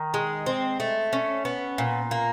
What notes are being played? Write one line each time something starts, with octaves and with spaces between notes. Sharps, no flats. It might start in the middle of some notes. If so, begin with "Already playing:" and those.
Already playing: D#3
G#3
C4
A3
C#4
B3
A#2
A#3